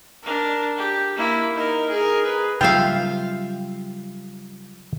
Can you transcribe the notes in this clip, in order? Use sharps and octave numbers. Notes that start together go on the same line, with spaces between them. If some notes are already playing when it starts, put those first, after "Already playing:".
D4 A#4
G4
A#3 E4
D#4 A#4
G#4 A#4
G#4 B4
C#3 F#3 G3 F4 E5 F5 G5